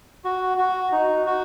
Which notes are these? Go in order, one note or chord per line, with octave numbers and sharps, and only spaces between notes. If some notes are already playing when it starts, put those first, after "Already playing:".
F#4
F#4
D#4
F#4